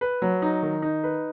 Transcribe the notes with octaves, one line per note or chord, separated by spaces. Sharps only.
B4
F#3
D#4
D#3
D#4
B4